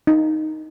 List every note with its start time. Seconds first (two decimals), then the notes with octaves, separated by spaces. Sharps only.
0.07 D#4